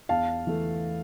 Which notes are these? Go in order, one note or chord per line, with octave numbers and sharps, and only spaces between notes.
E2 F5 A5
E3 A3